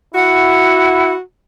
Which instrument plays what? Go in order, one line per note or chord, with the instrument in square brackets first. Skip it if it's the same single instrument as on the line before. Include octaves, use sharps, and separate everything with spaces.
[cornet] E4 [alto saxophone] F#4 [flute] F#5